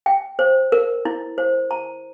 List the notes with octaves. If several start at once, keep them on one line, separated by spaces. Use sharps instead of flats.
G5
C5
A#4
E4
C5
A#5